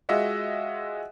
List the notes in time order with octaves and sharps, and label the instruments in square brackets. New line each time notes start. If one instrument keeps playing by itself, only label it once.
[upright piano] G#3 F4 F#4 D#5 E5 F#5